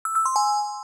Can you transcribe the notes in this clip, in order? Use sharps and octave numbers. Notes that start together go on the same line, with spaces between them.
E6
E6
C6
G#5